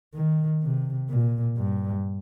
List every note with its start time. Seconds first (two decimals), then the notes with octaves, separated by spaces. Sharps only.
0.14 D#3
0.62 C3
1.09 A#2
1.57 G2